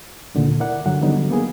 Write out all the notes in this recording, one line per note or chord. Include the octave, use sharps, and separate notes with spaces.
D2 A#2 D3 D#3
E4 A#4 D5 F#5
G2 D3 F#3 F#5
D3 D#3 F#3 G3 B3 D#4
A#3 B3 G#4